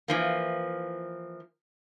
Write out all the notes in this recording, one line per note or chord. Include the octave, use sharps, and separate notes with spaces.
E3 F3 A#3